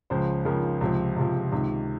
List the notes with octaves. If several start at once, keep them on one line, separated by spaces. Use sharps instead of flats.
C#2 C#3 F3 C5
C#2 C#3 F3 A#4
C#2 C3 F3
C#2 C3 F3
C#2 C3 D#3